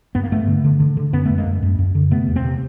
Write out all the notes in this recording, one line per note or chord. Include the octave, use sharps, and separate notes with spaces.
G2 B3
A#3
G2 A3 B3
D3
D3
D3
D3
F#2 B3 C#4
F#2 A3 B3
G#3 A#3
F#2
F#2
F#2
D3
C3 A3 B3
E2
A#3 C4
C3